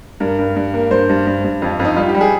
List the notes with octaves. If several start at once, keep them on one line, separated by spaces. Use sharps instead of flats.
G2 A#4
G2
G2
A#3
G2 C5
G2
G2
G2
F2
F2
D#4
G3 F4
G4
G3
G#4